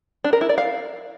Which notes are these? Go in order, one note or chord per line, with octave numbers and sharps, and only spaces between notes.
D4
A#4
E4
D5
F5